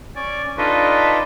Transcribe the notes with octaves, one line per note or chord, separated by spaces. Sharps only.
C#4 D5 G#5
D4 D#4 F4 A4 B4 D#5